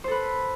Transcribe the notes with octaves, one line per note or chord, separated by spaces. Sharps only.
A4 B4 C5